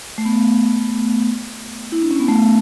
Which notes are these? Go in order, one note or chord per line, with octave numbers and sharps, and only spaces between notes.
A3
B3
E4
D4
C#4
B3
A3